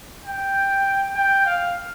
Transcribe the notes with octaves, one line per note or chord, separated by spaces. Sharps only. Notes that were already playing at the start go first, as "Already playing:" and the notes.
G5
G5
F5